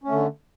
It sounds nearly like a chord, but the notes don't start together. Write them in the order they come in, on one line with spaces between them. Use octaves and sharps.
C#4 A3 D3